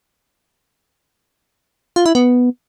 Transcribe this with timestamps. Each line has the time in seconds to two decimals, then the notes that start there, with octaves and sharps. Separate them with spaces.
1.96 F4
2.06 E4
2.15 B3